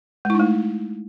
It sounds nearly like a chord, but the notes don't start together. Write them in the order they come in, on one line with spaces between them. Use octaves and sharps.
G#3 E4 D#4 A3